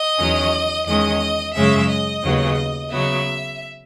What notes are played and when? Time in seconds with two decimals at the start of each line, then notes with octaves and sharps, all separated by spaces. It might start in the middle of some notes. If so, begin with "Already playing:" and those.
Already playing: D#5
0.17 E2 D#3 F#3 C#4
0.85 E2 D#3 G#3 C#4 D#5
1.53 F#2 C#3 G#3 C#4 E5
1.88 D#5
2.22 D#2 C#3 F#3 B3
2.90 C#3 F#3 B3 E5